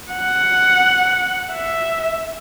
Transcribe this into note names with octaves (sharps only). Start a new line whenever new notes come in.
F#5
E5